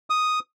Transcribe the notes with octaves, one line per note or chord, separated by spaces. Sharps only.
D#6